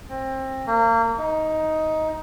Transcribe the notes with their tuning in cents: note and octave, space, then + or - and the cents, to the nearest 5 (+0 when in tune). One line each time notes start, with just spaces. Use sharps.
C4 +25
A#3 -30
D#4 +10